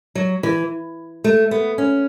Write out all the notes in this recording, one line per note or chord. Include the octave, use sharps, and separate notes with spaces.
F#3
E3
A3
B3
C#4